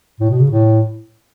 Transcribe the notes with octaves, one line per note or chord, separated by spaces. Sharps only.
A2
B2
C#3
A2